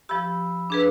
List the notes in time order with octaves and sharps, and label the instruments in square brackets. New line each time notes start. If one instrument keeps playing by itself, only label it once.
[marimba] F3 G4 [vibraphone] B5 E6
[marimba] D4 G#4 B4